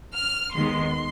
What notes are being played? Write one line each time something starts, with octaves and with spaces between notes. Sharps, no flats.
F6
D#2 D#3 G#3 B3 C6